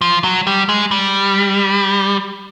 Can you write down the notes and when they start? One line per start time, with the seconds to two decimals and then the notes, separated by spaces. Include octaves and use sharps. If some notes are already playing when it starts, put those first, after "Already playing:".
0.01 F3
0.24 F#3
0.47 G3
0.69 G#3
0.91 G3